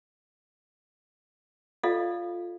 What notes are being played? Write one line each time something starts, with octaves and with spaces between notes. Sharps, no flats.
F4 A4 D5 D#5 F5